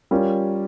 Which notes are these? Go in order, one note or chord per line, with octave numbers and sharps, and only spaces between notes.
G3 C#4 F4 A#4